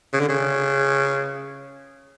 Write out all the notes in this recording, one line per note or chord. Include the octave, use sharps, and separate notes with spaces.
C#3
D3
C#3